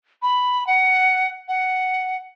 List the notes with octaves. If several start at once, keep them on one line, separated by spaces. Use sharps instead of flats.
B5
F#5
F#5